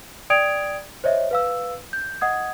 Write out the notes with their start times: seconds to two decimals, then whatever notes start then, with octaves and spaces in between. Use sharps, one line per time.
0.30 D5 G5 D#6 G#6 D7 F7
1.04 C5 C#5 D#5 E5
1.31 B4 F5 E6
1.93 G6
2.21 D#5 F#5 D#6 G#6